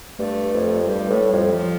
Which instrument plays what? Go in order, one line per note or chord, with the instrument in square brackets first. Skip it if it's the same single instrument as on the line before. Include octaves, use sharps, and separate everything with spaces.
[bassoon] G2 [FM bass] A3
[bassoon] F2
[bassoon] G2 [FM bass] G3
[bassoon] A2 [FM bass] A3
[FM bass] G3
[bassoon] F2
[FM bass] F3